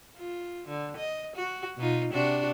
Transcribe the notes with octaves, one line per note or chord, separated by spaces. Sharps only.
F4
D3
D#5
F#4
B2 D#4 F4
C3 D4 F#4